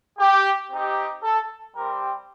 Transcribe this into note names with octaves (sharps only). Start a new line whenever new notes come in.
G4
C4 D#4 G4
A4
G3 C4 G4 A#4